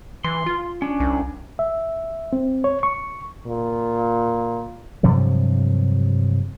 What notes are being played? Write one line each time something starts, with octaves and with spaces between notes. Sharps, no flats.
E3 C6
F4
C#4 D4
C2
E5
C4
C#5
C#6
A#2
G2 C3 F3 F#3